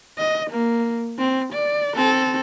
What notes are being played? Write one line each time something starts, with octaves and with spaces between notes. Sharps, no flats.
D#5
A#3
C4
D5
C4 A4